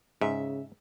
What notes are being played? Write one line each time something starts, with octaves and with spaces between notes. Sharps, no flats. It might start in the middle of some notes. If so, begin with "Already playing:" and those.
G#2 C#3 E5